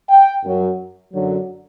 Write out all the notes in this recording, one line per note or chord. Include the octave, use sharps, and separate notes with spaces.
G5
F#2 F#3
F#2 D3 F#3